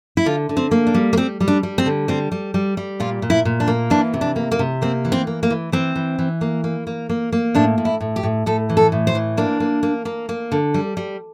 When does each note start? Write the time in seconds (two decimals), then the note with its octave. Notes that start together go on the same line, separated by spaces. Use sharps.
0.17 E4
0.26 D3 F4
0.49 D3
0.57 C4
0.71 A#3
0.87 D4
0.94 G3
1.13 A#3
1.17 G3 C4
1.40 G3
1.48 D4
1.63 G3
1.78 C4
1.86 D3
2.08 G3 C4
2.32 G3
2.54 G3
2.77 G3
3.00 A#2 F4
3.22 A#2
3.30 E4
3.45 A#2
3.60 D4
3.67 A#3
3.90 E3 D4
4.14 C3
4.21 D4
4.36 A#3
4.51 A#3
4.59 C3
4.82 A#3 C4
5.05 E3
5.12 C4
5.27 A#3
5.43 A#3
5.50 E3
5.72 E3 C4
5.96 E3
6.19 E3
6.41 A#3
6.64 A#3
6.87 A#3
7.09 A#3
7.32 A#3
7.55 A2 D4
7.78 A2
7.85 E4
8.01 A2
8.16 G4
8.23 A2
8.46 A2 A4
8.70 E3
8.77 A4
8.92 A2
9.07 C5
9.15 E3
9.37 A#3 D4
9.60 A#3
9.83 A#3
10.05 A#3
10.29 A#3
10.52 D3
10.74 G3
10.97 G3